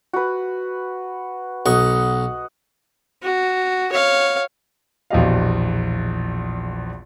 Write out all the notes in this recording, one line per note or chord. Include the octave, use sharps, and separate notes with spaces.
F#4 B4
B1 D#5 F#5 C#6
F#4
C#5 F5
A#1 E2 B2 G4 D#5 F5